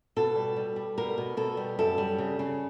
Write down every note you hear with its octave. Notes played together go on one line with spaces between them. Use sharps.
B2 A4
G3
G3
G3
B2 A#4
B2
B2 A4
G3
F#2 A4
G3
C#3
C#3